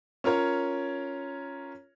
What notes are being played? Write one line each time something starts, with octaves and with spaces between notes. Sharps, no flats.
C#4 F4 A#4 C#5